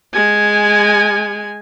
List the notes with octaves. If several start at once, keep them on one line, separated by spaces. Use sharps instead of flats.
G#3 G#5